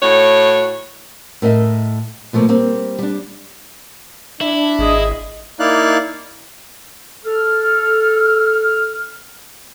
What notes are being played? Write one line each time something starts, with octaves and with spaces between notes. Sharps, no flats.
A2 F#4 C#5
A2 A#4 D#5 E5
B2 F3 A3 A#3
G3 A#3 C4
G3 D4
D4 E4
G#1 G#4 D#5
A#3 D#4 E4 D5 F5 F#6
A4 F6